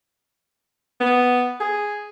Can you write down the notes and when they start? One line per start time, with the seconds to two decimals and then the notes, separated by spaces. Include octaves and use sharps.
1.00 B3
1.60 G#4